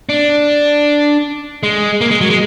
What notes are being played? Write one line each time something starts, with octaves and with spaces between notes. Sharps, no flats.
D4
G#3
A#3
G#3
F#3
G#3